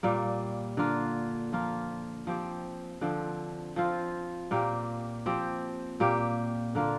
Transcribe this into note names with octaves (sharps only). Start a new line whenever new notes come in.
A#2 G3 A#3
D3 A#3 F4
F3 A#3 F4
F3 C4 G4
D3 F3 C4
F3 C4 F4
A#2 A#3 G4
F3 C4 G4
A#2 A#3 G4
D3 A#3 F4